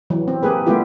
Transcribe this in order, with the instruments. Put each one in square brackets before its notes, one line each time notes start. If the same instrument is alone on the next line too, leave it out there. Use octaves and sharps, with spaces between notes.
[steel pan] E3 F#3
C4
A#3 G4 G#4 B4
G3 A3 B3 E4 F4 G4